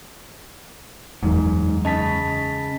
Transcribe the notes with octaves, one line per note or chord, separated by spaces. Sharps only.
F#1 E2 G#2 F#3
C#3 D#5 A5 B6